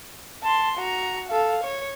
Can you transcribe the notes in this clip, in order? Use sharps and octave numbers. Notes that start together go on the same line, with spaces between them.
A5 C6
F#4 A#5
A4 F5
C#5